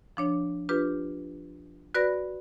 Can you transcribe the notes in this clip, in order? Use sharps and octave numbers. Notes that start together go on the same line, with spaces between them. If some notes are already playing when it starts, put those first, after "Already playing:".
F3 D4 C#5
D4 F4 G4 B4
F#4 B4 D5 B5 A#6